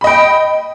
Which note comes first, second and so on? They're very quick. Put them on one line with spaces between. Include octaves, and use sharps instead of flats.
B5 D#5 G5